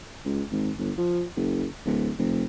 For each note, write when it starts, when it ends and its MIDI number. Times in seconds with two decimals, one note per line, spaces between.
0.25 0.42 37
0.51 0.70 32
0.78 0.91 31
0.97 1.23 53
1.36 1.66 30
1.85 2.10 26
2.18 2.44 29